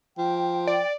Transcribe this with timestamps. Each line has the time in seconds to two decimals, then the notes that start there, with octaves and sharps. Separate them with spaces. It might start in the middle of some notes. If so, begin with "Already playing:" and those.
0.18 F3 G5
0.67 D5